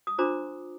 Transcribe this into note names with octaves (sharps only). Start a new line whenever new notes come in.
D#6
D4 F4 C5 A#5 D6